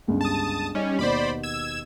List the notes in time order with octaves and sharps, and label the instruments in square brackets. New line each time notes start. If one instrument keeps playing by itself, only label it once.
[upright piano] G1 C#2 G2
[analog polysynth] A5 D#6
[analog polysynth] G3 C#4 [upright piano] D#4
[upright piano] D#2 B2 [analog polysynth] C5 D5 B5
[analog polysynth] E6 G#6 E7